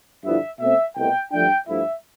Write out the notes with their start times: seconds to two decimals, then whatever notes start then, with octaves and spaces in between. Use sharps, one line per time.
0.24 G2 D3 F3 B3 E4 E5
0.60 B2 A3 C4 E5
0.95 C2 B2 A3 E4 G5
1.32 G2 D3 F3 A3 D4 G5
1.68 G2 F3 A3 E4 E5